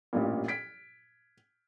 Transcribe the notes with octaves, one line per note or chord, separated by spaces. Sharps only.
A1 G2 A#2
G#6 B6 D7